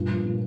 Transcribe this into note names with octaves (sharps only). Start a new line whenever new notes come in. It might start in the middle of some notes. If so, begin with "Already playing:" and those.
Already playing: G2 A#2
F3
A#2